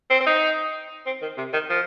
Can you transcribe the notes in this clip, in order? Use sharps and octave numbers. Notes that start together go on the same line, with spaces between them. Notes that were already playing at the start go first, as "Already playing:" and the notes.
C4
C4
D#4
C4
D#3
C3
D#3
F3